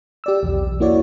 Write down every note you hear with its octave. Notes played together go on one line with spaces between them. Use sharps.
G4 D5 E6
B1 E2
A#3 E4 F#4 C#5 D5